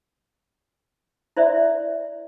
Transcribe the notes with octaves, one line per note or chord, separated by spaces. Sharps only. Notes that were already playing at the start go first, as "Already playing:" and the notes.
E4 C5 D5 E5